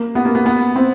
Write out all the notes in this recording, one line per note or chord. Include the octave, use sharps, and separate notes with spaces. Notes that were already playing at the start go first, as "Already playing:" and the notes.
Already playing: A#3
B3
A#3
B3
B3
C4